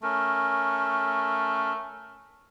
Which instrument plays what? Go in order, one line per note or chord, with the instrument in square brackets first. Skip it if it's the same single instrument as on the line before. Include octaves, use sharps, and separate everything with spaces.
[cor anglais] A3 [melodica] C#4 A#4